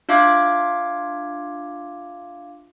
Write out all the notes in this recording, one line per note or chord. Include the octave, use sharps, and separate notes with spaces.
D4 F4 E5 F5 D6 G#6